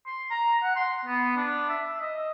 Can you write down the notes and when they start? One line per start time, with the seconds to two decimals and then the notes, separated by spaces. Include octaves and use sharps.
0.06 C6
0.31 A#5
0.63 F#5
0.76 C6
1.05 B3
1.36 D4
1.70 E5
2.01 D#5